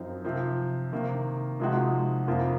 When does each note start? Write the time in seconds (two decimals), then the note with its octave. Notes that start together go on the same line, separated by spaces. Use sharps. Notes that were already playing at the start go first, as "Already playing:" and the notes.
Already playing: F#2 F3 C4 D#4
0.25 C3 F3 C4
0.92 C3 D#3 A#3
1.60 C3 F3 G#3 D#4 F#4
2.27 F2 C3 F3 A#3 F4